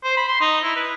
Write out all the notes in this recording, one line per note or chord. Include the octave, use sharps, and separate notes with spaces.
C5
B5
C6
D#4
E4
B4